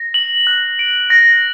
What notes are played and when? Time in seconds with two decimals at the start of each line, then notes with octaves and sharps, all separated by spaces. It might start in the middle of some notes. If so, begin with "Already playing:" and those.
Already playing: A#6
0.14 F#7
0.47 F#6
0.79 D7
1.10 A#6